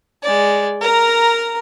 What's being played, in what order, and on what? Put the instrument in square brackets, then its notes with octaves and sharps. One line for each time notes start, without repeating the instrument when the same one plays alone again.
[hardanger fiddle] G#3 D5
A#4 A#5